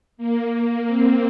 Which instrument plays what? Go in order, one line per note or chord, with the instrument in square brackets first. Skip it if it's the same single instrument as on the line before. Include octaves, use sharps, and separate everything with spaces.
[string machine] A#3
C4